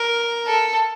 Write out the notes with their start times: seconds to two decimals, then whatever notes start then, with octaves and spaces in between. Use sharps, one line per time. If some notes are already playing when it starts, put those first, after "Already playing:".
Already playing: A#4
0.47 A4